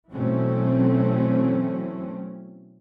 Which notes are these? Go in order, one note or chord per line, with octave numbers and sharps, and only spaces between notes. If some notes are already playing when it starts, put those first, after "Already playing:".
B2 E3 F#3 A3 C4 C#4